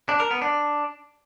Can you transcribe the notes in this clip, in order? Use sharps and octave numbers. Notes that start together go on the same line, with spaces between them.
D4
A#4
B3
D4